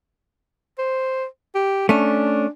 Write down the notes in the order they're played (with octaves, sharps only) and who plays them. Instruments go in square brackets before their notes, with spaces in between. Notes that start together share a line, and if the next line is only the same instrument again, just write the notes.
[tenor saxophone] C5
G4
[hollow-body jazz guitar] A3 C#4 [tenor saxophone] D4